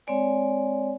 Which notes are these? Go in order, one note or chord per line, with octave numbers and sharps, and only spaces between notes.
G#3 C4 C#5 D5 G#5